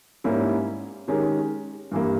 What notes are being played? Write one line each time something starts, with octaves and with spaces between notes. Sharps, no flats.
G#2 G3 A#3 C#4 E4
D#3 G#3 C#4 G4 A#4
G2 E3 G3 A#3